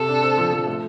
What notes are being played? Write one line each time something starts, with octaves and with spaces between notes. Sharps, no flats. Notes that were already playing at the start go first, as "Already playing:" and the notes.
Already playing: C3 A4
D4
C4
F3
F3
A3